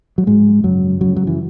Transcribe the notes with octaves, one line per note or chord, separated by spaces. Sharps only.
F#3
G#2 G#3
F#2 C#3 F#3
F#2 C#3 F#3
F#3
E3